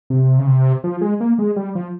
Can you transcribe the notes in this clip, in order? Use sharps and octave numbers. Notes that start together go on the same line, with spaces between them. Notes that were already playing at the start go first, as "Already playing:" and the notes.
C3
C#3
C3
F3
G#3
A#3
G#3
G3
F3